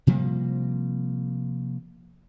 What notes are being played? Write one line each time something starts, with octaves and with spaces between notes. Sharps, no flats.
C3 F3 G3 A#3